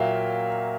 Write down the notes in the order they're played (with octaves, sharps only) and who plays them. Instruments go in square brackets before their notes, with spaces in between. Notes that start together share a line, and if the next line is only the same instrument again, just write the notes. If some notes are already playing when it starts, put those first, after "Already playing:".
Already playing: [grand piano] A#2 F#3 A#3 E5 F5 G5